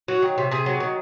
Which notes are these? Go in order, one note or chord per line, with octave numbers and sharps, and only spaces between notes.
F#3 F#4
D#3
C3
C3 G#4
F#3
D#3